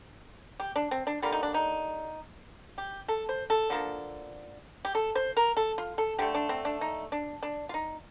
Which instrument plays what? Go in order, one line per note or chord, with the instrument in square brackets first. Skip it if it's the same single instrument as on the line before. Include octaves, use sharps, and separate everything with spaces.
[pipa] G4
D4
C4
D4
D3 G3 A#3 F4
D#4
D4
D#4
G4
A4
C5
A4
D3 F3 A#3
G4
A4
C5
A#4
A4
F4
A4
D3 A3 G4
D4
C4
D4
D#4
D4
D4
F4
D#4